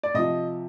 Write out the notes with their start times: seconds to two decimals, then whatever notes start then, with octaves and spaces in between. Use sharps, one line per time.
0.03 D5
0.14 C3 F3 D#5